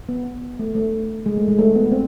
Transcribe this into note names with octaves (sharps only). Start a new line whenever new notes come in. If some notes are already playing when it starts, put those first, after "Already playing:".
B3
A3
A3
G#3
A3
G#3
A3
B3
C4